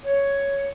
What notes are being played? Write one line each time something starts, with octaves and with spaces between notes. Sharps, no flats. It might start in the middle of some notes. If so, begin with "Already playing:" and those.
C#5